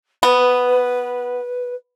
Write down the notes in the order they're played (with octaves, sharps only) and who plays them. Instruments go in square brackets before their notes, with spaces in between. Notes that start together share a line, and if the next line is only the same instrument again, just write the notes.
[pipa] B3 [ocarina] B4